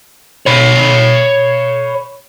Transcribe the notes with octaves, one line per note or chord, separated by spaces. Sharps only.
C#5 B5